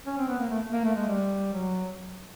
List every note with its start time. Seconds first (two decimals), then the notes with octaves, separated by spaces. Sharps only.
0.06 C#4
0.17 C4
0.28 B3
0.39 A#3
0.50 A3
0.72 A#3
0.85 A3
0.96 G#3
1.07 G3
1.53 F#3